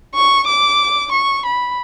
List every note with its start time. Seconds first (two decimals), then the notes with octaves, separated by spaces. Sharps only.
0.15 C#6
0.48 D6
1.12 C#6
1.46 B5